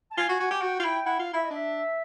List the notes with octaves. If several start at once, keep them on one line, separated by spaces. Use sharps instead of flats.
A5
F4 G#5
F#4
F#4
G4
F#4 G5
F4
E4
E4 F#5
F4 F5
E4 E5
D#5
D4 E5